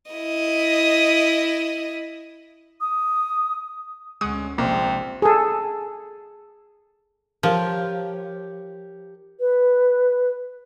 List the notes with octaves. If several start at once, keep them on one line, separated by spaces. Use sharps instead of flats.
E4 D#5
D#6
D2 G#3 C#4 F#5 C#6 D#6
A#1 C3 G3 G#3 A#3 C4
G#4 A4
F3 G4 A#4 C#5
B4